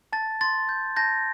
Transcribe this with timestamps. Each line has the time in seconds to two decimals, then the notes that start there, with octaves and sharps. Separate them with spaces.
0.13 A5 A6
0.41 C6 A6
0.69 G6
0.96 A5 G6 A#6